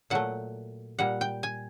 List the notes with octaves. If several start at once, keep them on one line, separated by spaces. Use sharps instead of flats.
A#2 F#3 A3 F#5
A#2 G3 F#5
G5
G#5